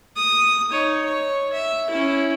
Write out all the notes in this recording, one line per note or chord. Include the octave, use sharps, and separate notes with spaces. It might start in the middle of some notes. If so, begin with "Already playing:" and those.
D#6
D#4 C#5
C#5
E5
C#4 E4